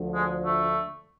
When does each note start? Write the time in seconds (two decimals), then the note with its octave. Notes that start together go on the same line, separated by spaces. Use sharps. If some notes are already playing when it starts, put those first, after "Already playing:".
Already playing: D2 D3 F3
0.15 G#3
0.45 A3